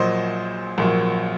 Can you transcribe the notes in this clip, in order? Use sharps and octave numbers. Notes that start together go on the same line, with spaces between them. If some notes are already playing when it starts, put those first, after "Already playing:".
Already playing: A#1 A#2 F#3 C5 D#5
A#1 A#2 F#3